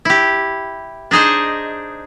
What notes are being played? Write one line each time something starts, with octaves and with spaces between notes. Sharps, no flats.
E4 G4
D4 D#4 G#4 C5 D#5